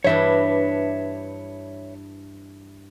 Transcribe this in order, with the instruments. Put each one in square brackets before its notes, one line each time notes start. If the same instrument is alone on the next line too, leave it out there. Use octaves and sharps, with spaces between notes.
[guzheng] G2 E3 D4 [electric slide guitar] C#5 E5